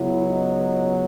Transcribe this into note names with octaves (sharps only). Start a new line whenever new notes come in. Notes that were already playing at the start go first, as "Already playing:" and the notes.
Already playing: C#2 C#3 F#3 B3 E4
D#4